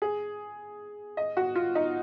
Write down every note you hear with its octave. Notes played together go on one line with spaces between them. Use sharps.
G#4
D#5
F#4
F4
D#4